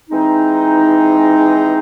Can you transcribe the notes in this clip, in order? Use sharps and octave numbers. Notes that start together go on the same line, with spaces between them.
E3 G#3 C4 D#4